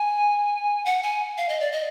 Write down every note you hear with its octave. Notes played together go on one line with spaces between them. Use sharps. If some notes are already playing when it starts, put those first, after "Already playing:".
Already playing: G#5
F#5
G#5
F5
D#5
D5
D#5